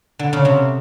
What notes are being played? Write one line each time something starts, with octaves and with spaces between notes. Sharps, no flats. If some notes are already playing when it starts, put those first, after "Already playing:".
D3
C#3
C3